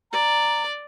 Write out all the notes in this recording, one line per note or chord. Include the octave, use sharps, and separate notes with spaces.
D5 A#5